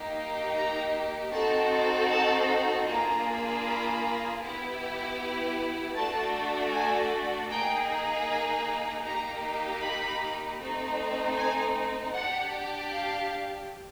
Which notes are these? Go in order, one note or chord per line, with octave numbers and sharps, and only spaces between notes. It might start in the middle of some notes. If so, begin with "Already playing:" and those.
Already playing: A#3 D#4 G4
A#5
C4 D#4 F#4 A4 A5
A5
A#3 D4 F4 G#4 A#5
B5
B3 E4 G4
A3 D4 F#4 A5
G#5
A#3 D#4 G#4 G5
G#5
A#3 D#4 G4 A#5
B5
A3 C4 D#4
G#5
D4 G4 F#5
F5